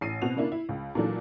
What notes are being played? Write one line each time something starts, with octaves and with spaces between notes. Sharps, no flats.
A1 C7 D#7
B2 C4 F#4 F7
C#3 A#3 D4 E4
E4
C#2
A#2 D#3 E3 F#3 D4 A4